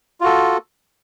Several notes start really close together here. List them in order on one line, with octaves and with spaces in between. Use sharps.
F4 F#4 A4